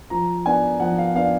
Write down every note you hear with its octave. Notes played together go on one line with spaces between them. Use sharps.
F3 A#5
B3 D4 G#5
F3 F#5
F5
B3 D4 F5